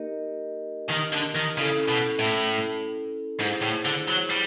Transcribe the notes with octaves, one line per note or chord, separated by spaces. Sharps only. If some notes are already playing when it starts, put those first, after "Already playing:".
Already playing: A#3 D#4 G4 A#4 D#5
D#3
D3
D#3
C#3 C#4 E4 A4
B2
A2
G#2 E4 G#4 C5
A2
D3
F#3
G3